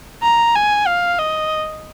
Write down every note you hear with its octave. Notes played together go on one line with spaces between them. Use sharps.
A#5
G#5
F5
D#5